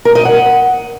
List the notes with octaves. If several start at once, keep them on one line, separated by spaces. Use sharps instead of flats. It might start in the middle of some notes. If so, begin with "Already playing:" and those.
A#4
D#5
F#5